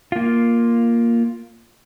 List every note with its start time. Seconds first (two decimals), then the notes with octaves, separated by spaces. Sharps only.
0.12 A#3 F4